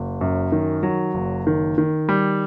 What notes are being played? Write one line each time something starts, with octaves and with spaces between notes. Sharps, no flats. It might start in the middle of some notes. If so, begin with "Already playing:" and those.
Already playing: F#1
F#2
D#3
F#3
F#1
D#3
D#3
G3